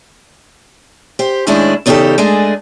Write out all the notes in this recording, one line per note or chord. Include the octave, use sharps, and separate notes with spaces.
G4 C5
A2 D#3 G#3 C#4 D4 E4
E2 C#3 D#4 F4 G4 A4
G#3 A3 D4 G#4